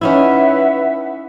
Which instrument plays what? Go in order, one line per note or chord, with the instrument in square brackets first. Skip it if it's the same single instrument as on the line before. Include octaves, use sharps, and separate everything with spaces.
[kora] C#4 D#4 E4 [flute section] B4 E5 F#5